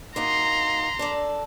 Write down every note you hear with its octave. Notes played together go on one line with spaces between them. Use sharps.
A#3 D#4 F#4 A#5 C6
D4 A4 D5